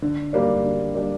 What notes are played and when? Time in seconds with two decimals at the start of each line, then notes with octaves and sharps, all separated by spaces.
0.02 D3
0.33 G3 A#3 D4
0.64 D3
0.95 G3 A#3 D4